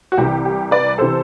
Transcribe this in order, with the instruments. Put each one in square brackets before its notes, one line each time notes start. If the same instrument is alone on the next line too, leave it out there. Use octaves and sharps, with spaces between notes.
[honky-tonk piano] F#4
C2 C3 E3 G4
G4
B4 D5
C3 E3 A4 C5